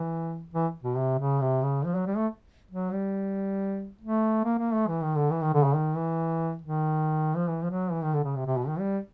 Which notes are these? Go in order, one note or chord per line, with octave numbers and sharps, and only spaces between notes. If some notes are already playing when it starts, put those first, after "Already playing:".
Already playing: E3
E3
B2
C3
C#3
C3
C#3
F3
F#3
G3
A3
F#3
G3
A3
A#3
A#3
A3
E3
D#3
D3
E3
D#3
D3
C#3
D#3
E3
D#3
F3
E3
F3
F#3
E3
D#3
D3
C#3
C3
C3
B2
D#3
G3